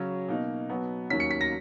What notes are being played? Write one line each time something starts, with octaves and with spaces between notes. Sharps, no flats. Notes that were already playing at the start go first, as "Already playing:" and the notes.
Already playing: C#3 F#3 C#4
B2 A#3 D#4
B2 F#3 B3
D#2 D#3 F#3 C#4 B6
C#7
B6
A#6